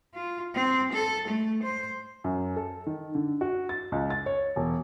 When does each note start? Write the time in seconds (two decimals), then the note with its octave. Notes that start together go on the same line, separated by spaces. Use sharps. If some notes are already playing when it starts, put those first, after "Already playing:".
0.14 F4
0.54 C4
0.93 A4
1.28 A3
1.63 C5
2.24 F#2
2.57 A4
2.86 D#3
3.15 D3
3.41 F#4
3.69 A6
3.92 C#2
4.10 A6
4.26 C#5
4.56 E1